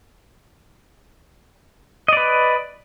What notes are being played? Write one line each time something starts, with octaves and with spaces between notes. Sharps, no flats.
B4 D5 D#5